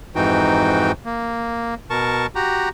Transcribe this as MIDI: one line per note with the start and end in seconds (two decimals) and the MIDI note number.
0.15 0.92 41
0.15 0.92 44
0.15 0.92 52
0.15 0.92 63
0.15 0.92 66
0.15 0.92 79
1.05 1.75 58
1.90 2.26 47
1.90 2.26 70
1.90 2.26 81
1.90 2.26 85
2.35 2.69 66
2.35 2.69 67
2.35 2.69 82